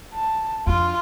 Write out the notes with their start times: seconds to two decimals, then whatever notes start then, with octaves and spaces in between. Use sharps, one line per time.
0.14 A5
0.67 F2 D4 F4